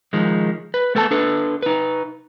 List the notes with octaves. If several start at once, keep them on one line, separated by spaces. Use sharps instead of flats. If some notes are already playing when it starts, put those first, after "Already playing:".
D#3 F3 G#3
B4
A3 B3 A4 G5 A5
D4 A4 B4
D#4 B4